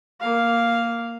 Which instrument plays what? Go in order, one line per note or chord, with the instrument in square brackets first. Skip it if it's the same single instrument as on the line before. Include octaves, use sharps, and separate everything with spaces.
[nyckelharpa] A#3 F5